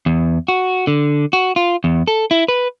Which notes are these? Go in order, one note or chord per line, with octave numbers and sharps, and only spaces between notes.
E2
F#4
D3
F#4
F4
E2
A4
E4
B4